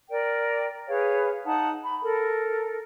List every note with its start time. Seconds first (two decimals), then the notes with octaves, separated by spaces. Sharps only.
0.10 A#4 D5 G5
0.88 G#4 B4 C#5 F5
1.45 D#4 F#5 A5 D#6
1.85 B5
2.03 A4 A#4